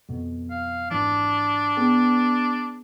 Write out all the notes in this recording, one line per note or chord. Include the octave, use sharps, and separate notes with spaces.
F2 B2
F5
G#1 G#2 E3 D4
B3 G#4 G5